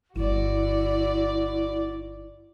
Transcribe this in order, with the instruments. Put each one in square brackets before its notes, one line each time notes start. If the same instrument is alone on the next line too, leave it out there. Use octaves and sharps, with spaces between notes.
[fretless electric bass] G1 [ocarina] E4 [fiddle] F#4 D5